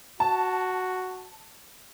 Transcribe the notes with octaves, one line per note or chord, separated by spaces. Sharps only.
F#4 A5